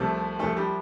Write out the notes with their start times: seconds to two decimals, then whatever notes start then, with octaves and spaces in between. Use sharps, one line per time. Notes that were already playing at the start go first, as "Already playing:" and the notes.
Already playing: C2 C3 F3 A3
0.39 C2 C3 F3 A3 A4
0.56 G3 G4